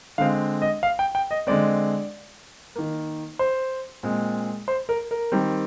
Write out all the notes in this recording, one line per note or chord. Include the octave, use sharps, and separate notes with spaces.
D3 G#3 C4 F5
D#5
F5
G5
G5
D#5
D3 G#3 C4 D5
D#3 A#3
C5
A#2 G#3 C4
C5
A#4
A#4
D#3 G3 C4